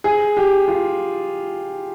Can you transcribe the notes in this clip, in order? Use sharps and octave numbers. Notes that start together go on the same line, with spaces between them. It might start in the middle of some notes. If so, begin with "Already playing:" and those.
G#4
G4
F4